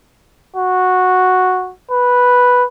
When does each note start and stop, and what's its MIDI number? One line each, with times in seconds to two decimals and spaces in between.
0.56 1.72 66
1.91 2.64 71